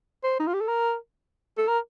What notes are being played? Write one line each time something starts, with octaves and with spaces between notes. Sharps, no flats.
C5
D#4
F4
G4
A4
A#4
A4
A#4